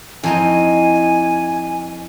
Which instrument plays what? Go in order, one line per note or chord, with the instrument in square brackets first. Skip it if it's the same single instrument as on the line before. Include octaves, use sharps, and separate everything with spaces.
[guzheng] F2 D#4 D#5 [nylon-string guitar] E4 A5 [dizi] G#5